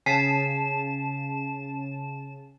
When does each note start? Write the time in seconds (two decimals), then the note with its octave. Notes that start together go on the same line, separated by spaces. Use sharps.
0.06 C#3 G#5 A5 B6 C7 E7